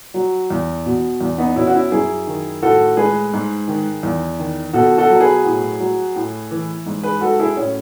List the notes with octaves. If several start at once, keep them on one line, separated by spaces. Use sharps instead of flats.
F#3
E2
B2
E2
B3 D#4
B2 C#4 E4
F#4
C#4 E4
F#2 E4 G#4
D#3
A2 F#4 A4
G#3 G#4 B4
G#2
D#3
E2
D#3
B2 F#4 A4
F#4 A4
F#3
G#4 B4
A2
F#3
A2
E3
G#2
G#4 B4
F#3 F#4 A4
E4 G#4
A2 C#4